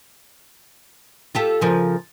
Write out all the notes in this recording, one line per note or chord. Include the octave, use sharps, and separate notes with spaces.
F4 G4 A4
C#3 F3 A#4